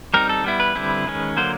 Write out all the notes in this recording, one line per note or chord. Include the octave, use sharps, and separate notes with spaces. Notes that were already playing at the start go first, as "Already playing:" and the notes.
G3 C4 D#4 A#4
A4
G3 B3 E4
B4
D3 G3 C4 E4
D#3 G#3 C#4
D3 F#3 A#3 C5